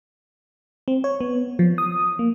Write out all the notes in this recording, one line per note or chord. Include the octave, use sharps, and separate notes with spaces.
C4
C#5
B3
F3
D#6
A#3